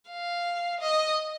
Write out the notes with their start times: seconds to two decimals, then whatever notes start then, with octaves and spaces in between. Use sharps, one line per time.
0.11 F5
0.81 D#5